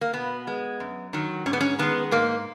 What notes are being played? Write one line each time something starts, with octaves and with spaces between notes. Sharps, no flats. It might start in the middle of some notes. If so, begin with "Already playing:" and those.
A#3
B2 B3
G#3
F#2
D#3 F#3
G#2 C#4
B3
C#4
D#3 G#3 B3
G#2 A#3